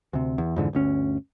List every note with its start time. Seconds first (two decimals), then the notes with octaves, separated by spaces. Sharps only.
0.13 D2 C3
0.38 E2
0.56 F2 G#2 D3 E3
0.73 G1 D2 C#4